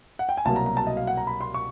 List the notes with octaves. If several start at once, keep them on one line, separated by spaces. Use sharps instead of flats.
F#5
G5
G#5
C2 B2 F#3 A#3 A5
A#5
A#5
A5
D#5
F5
F#5
A#5
B5
C6
C#6